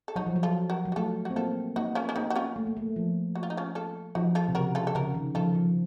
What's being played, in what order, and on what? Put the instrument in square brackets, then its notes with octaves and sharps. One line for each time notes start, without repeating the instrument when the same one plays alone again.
[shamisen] A4
[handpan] F#3 [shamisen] D#4 F#4
[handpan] F3
F#3
[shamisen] F4 A4
F#4 A#4
[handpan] F#3
[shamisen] F#4
[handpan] A3 [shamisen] F4 A4
[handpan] C4 [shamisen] F#4
[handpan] A#3 [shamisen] F4 A4
[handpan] A#3 [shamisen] D#4 F#4
[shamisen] C#4 F4
C#4
[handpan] A#3 [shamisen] C4 D#4
[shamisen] F#4
C#4 F4
[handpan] A3
A#3
A3
F3
[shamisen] F#4
F4
D#4
C#4 F4
F4 A4
[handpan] F3 [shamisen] D#4 F#4
[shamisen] F4 A4
[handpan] C3
[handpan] C#3 [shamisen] F#4 A#4
[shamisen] F4 A4
A4
[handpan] C#3 [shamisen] F#4 A#4
[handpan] D#3
[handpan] F3 [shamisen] F4 A4
[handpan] F3